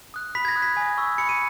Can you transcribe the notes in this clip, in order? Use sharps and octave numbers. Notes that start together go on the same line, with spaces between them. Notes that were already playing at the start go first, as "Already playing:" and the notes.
D#6 F#6
B5 B6
G#6
A#6
D#6 F#6
B6
G#5
C#6 E6
B5 C#7
D#7